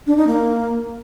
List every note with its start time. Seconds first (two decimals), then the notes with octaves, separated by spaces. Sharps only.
0.07 D4
0.17 D#4
0.27 A#3